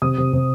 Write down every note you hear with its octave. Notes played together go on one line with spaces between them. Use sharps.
C3 D#6
C3
C3